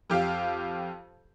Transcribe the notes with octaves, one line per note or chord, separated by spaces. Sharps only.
F2 G4 F5